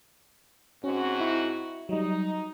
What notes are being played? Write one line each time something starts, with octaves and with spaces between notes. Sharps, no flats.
G#2 C4 C#4 F#4
E4
F#3 G3 D#4